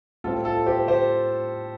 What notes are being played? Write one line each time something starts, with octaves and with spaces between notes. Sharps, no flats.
A2 G3 C4 F4 A4
F4 A4
G4 C5
G4 C5